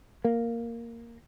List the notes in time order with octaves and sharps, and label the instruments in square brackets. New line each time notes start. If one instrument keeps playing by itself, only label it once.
[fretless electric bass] A#3